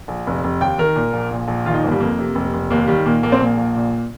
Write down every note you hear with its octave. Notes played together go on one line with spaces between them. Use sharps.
A#1
F1
F1
D#2 G5
D#3 A#4
A#2
A#1
A#2
A#1
D#3 F4
D#4
G1 A#3
G3
F2 A#3
C3
F1
F1
D#2 A#3
D#3 G3
A#2 A#3
A#1 A#3
C4
A#2 A#3
A#1
A#2